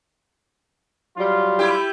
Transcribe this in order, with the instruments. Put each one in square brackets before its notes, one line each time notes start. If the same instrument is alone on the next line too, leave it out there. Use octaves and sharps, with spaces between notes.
[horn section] F#3 G3 F4
[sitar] A3 E4 G4